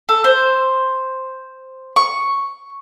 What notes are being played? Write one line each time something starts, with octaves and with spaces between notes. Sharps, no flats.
A4
C5
C#6